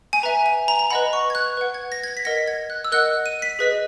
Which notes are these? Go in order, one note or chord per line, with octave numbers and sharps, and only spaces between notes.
G#5
B4 E5 A#5
G#5
A#5
A#5
B4 D#5 F#5 B5
C#6
G#6
F#6
B4 F#5
G#6
A#6
G#6
A#6
B6
A#4 D#5 F#5 A#6
G#6
F#6
E6
A#4 D#5 F#5 F#6
D#7
B6
G#4 B4 D#5